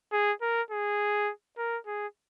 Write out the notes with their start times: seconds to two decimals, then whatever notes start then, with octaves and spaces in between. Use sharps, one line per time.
0.12 G#4
0.42 A#4
0.71 G#4
1.57 A#4
1.86 G#4